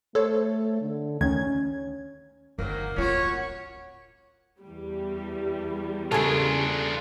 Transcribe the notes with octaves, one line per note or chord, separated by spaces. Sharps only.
A3 A4 C5 C#5
D3
D2 D#3 C#4 G#6
G1 G#2 D#3 F#3 A#3
D1 C#4 F4 F#4 A#4 C#5
E2 G3
C#3 A#3 D4 F4 A4 G#5